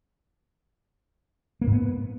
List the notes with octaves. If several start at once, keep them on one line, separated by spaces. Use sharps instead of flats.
A#3
G#2
B3